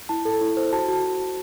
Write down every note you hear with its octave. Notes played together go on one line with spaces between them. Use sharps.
E4 A5
A4
E4
C5
F#4 A5
F#4